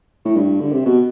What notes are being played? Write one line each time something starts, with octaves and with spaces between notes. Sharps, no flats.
A2
G2
D3
C3
B2